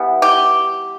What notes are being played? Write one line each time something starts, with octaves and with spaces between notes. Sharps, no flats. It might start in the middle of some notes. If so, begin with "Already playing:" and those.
Already playing: E3 G3 B3
G4